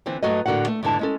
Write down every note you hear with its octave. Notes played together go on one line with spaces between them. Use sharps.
D3 E3 C4
G2 F#3 A3 F#4 D#5
A2 D3 F#4 A#4 F#5
A3
E2 G#2 D3 E4 A5
G#3 C#4 A4